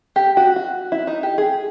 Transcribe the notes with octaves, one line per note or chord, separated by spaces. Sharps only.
G4
F#4
F#4
E4
D#4
G4
G#4